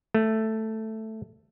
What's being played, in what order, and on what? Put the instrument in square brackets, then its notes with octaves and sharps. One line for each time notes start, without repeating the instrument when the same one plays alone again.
[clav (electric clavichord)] A3